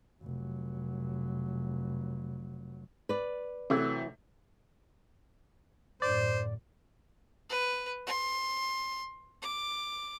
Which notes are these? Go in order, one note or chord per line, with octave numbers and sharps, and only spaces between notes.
F1 F#3
B4 D5
C3 E3 F#3 A3
F#2 A2 D3 C5 D5
B4
C6
D6